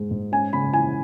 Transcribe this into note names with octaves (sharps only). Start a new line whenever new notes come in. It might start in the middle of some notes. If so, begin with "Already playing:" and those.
Already playing: G#2 G#3
G#2
C#4 G#5
C#3 B5
E3 G#5